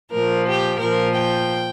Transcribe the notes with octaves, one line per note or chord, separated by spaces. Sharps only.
A#2 F3 A#4
G4
A#2 F3 A#4
G5